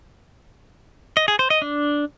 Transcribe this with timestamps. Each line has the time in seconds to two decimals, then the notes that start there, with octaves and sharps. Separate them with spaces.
1.17 D#5
1.28 G#4
1.39 C5
1.50 D#5
1.62 D4